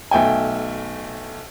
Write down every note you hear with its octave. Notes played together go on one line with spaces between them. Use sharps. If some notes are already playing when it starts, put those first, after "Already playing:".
B1 A3 G5 G#5